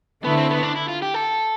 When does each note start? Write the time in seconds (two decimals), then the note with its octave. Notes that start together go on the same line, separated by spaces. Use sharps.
0.24 D3 A3 B3 E4
0.37 C4
0.50 B3
0.63 D4
0.76 E4
0.88 F4
1.02 G4
1.14 A4